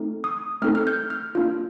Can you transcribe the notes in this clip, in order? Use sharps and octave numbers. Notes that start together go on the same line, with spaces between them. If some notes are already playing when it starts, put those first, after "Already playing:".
Already playing: A3 C4 D#4 A4
D#6
A3 C4 D#4 A4 F6
F6
G6
F6
A#3 D4 F4